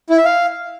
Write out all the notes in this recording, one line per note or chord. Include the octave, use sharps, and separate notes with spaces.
E4
E5
F5